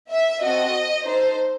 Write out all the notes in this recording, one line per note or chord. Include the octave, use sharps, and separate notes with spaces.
E5
C4 F#4 A4 D#5
D#4 A4 C5